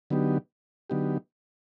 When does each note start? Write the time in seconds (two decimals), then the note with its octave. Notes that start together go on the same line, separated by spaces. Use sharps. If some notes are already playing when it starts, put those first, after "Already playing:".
0.10 D3 F#3 B3 D#4 G4
0.90 D3 F#3 B3 D#4 G4